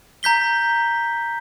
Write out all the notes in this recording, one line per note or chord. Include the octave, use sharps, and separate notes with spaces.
A#5 G6 B6 G7